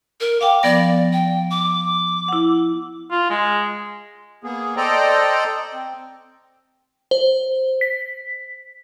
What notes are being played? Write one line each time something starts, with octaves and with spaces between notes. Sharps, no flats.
A#4
F5 G5 D6
F3 B3 D5 A#6
G5
D6
E4 F#5
F4
G#3
A#3 B3 G#4
A4 C5 D5 D#5 G5 A#5
C4
C5
B6